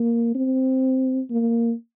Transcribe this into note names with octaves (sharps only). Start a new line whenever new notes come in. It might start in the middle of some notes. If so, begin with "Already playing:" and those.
Already playing: A#3
C4
A#3